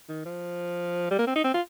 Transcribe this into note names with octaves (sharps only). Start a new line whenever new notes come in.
D#3
F3
G3
A#3
C4
D#4
C4
F4